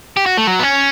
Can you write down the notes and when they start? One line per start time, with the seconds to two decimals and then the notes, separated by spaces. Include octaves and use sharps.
0.17 G4
0.26 F#4
0.37 A3
0.47 F#3
0.60 B3
0.63 C#4